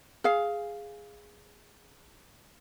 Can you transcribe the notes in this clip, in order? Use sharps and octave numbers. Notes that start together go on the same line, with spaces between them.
G#4 F5